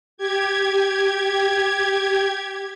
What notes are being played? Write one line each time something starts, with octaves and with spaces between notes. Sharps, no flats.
G4 G#6